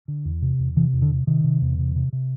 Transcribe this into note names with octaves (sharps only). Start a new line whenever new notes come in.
D3
E2
C3
E2
C3 E3
E2
D3
C3
C3 D#3
C3
E2
C3
C3
C3